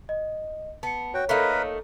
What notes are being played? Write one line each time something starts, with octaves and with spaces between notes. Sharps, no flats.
D#5
B3 A5 C#7
F#4 C#5 G5
A3 A#3 D#4 A#4 B4 B5